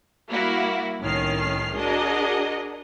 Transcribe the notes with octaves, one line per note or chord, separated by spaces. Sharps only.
G3 A#3 E4 F#4
C2 A2 D#3 C#4 F6 C7
D4 F#4 G#4 A#4 D#5